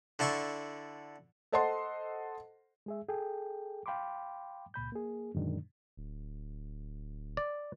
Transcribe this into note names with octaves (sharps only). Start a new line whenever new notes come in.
D3 E4 A5 C6 C#6
A4 C5 D#5 F#5 A5 C6
G#3 G#4 E5
G#4 A4 G5
F5 G5 B5 C6 D6
C#2 A#2 B5 G6
A#3 G#4
F#2 A#2 D3 D#3 G#3 D4
D1
D5